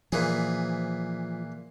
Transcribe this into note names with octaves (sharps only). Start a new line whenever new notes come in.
A#2 E3 F3 G#4